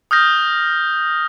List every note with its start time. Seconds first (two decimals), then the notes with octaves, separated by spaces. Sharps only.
0.11 D#6 F6 G6 A#6